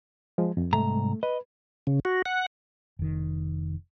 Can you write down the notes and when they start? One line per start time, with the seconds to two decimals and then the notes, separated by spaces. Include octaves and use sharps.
0.38 F3 G#3
0.57 F2
0.73 C2 G#2 A3 A#5
1.23 B4 D#5
1.87 C#3
2.05 F#4
2.26 F#5
2.99 F1 D#3